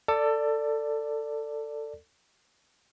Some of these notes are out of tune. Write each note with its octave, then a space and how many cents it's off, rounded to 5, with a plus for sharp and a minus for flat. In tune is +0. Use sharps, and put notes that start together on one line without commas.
A4 +20 D5 +0